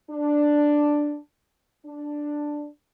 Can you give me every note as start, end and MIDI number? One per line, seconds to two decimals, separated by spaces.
0.10 1.18 62
1.86 2.68 62